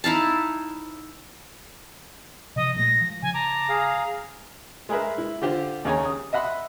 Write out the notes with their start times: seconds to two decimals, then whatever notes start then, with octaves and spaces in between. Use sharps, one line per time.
0.04 D#4 E4 F5 A5
2.56 C3 F3 D#5
2.76 A#2 G#3 A3 A#6
3.00 F3
3.22 C#3 G#5
3.34 A5 A#5 D6
3.69 G#4 F5
4.89 G#3 G#4 A#4 B4 E5
5.18 E4
5.42 D3 F4 G4 C5
5.85 D#2 C#3 C#5 G#5 A#5
6.05 D#6
6.33 D#5 E5 F#5 B5 C6